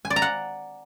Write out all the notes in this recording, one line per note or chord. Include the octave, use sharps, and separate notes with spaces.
G#5
D5
A#5
F#5